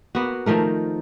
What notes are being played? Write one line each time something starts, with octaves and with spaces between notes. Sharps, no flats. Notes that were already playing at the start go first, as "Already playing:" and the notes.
A#3 B3 F#4
D#3 F3 A3 A#4